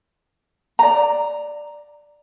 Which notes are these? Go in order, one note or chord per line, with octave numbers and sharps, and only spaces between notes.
D5 A#5